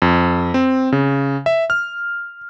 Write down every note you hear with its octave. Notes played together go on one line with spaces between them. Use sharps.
F2
C4
C#3
E5
F6